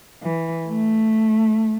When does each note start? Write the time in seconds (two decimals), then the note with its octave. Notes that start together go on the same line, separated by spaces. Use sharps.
0.23 E3
0.67 A3